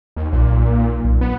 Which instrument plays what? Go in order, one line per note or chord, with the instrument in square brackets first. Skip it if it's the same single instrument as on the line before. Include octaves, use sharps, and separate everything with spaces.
[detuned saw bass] D#2
[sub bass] B1 [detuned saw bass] A#2
[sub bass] B1
[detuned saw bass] B3